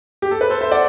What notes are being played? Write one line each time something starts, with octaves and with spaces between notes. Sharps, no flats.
G4
A4
B4
A4 C5
C5 E5
D5 F#5